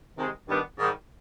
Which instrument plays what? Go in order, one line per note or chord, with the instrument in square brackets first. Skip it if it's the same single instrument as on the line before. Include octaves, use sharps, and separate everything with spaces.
[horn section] C3 D#3 G#3
G2 D#3 G3 B3 D4
G#2 D#3 G3